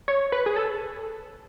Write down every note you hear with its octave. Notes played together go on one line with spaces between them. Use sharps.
C#5
B4
G#4
A4